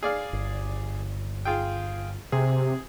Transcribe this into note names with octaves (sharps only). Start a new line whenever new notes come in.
G#4 D5 F5
G1
F4 G#4 G5
C3 G#4